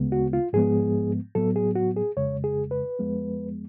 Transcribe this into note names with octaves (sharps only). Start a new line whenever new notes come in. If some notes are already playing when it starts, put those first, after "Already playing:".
Already playing: D2 C#3 G#3 B3
F#4
F4
G#2 F3 G#3 B3 G#4
A2 F#3 B3 A4
G#4
F#4
G#4
F2 C#3 G#3 C#5
G#4
B4
F2 F3 G#3 B3